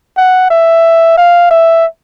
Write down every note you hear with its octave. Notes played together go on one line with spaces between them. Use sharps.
F#5
E5
F5
E5